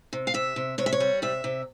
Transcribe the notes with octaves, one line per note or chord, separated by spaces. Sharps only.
C3
F5
C3 E5
C3
C3 C#5
E5
C#5
G3
C3 E5
C3